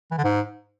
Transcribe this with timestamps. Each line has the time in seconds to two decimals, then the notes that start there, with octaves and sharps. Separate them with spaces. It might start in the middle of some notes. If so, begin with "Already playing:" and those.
0.12 E3
0.18 D3
0.24 G#2